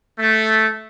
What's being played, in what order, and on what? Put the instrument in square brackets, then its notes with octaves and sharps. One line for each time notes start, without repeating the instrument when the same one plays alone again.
[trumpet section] A3